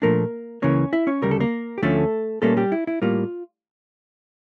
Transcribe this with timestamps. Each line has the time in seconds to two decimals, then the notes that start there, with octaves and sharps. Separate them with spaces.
0.02 A#2 F3 A3 A#3 D4 A#4
0.62 C#2 C#3 E3 A#3 C#4 C#5
0.93 E4 E5
1.07 C#4 C#5
1.22 D2 C#3 G3 A#4
1.31 A4
1.40 A#3 A#4
1.78 G4
1.82 D2 D3 F3 A3 C#4 A4
2.42 A#2 G3 A3 A#3 C#4 A4
2.57 G3 G4
2.72 E4
2.87 E4
3.02 A2 G3 A#3 F4